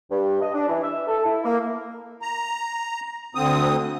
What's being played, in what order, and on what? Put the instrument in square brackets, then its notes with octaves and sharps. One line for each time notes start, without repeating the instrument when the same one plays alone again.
[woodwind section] G2
D#5
D4
E3
E5
A4
E4
A#3
[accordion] A#5
D2 D3 C4 D#6